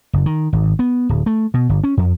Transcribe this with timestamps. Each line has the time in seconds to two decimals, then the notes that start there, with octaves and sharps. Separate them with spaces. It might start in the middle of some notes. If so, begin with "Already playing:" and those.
0.13 F#1
0.26 D#3
0.53 G#1
0.79 B3
1.09 D1
1.26 A3
1.54 B2
1.69 G1
1.84 C#4
1.97 F2